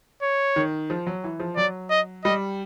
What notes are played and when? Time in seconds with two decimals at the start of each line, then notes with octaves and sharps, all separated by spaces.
0.22 C#5
0.56 D#3
0.90 F3
1.07 F#3
1.24 E3
1.40 F3
1.56 F#3 D5
1.90 D#5
2.24 G3 D#5